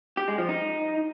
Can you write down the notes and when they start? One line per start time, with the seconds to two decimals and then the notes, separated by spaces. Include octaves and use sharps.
0.17 G4
0.28 G#3
0.38 F3
0.49 D#4